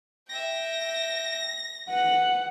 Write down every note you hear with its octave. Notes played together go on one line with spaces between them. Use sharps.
E5 G5 A#6
B4 F#5